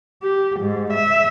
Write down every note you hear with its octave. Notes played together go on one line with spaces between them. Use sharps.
G4
G#2
E5